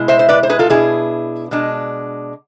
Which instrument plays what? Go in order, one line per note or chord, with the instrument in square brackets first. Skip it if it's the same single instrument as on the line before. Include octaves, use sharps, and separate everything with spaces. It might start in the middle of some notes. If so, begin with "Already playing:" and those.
Already playing: [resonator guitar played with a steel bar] B2 G#3 E4
C5 E5
C5
B4 D5
C5
G#4 B4
F4 A4
B2 B3 D4 E4 G#4
B2 G#3 D4